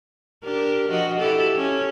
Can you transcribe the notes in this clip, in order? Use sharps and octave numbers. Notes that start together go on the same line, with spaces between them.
D4 G4 A#4
F3 F#4 D#5
E4 G4 A4
C#4